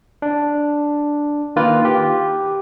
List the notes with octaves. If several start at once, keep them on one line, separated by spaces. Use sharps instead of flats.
D4
D#3 A#3 F4 B4
G4